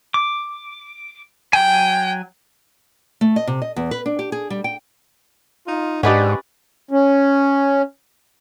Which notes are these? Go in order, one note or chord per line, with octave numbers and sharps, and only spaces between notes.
D6
F#3 G5 G#5
A3
D#5
C3
D#5
E2
B4
D4
G4
G#4
G3
G5
D#4 F4
G#2 C#4 D4 G4 B4 D5 D#5 F#5
C#4